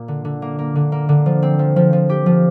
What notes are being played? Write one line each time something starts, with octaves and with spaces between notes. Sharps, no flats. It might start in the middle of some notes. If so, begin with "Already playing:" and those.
Already playing: A#2 A#3
D3
D3
A#3
A#3
D3
A#3
D3
F3
C4
F3
F3
F3
G4
F3